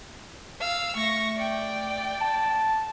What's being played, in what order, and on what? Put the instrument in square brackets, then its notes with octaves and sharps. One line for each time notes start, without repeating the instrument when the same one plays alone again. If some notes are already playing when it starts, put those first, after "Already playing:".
[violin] F5 E6
[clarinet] A3 [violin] C#6 A#6
[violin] D5 G5
[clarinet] A5